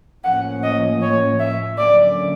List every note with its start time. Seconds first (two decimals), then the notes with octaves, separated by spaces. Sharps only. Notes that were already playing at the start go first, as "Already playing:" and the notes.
0.24 A2 F3 A#3 C#4 F#5
0.63 D#5
1.02 C#5
1.40 E5
1.78 D3 F#3 A#3 C#4 D5